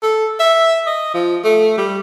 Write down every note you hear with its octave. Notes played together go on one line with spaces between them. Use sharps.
A4
E5
D#5
F3
A3
G3